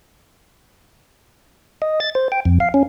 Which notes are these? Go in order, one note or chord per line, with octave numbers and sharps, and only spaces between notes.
D#5
A6
C5
G5
F2
F5
C#4